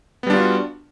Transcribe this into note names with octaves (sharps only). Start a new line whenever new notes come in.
G3 B3 D4 F4 F#4